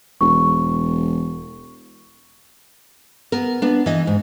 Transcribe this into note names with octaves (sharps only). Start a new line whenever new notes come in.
E1 C#6
B3 A#4
B3 D4
E3 D#5
G#2